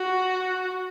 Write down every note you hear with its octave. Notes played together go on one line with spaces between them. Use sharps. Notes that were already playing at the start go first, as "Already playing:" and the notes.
Already playing: F#4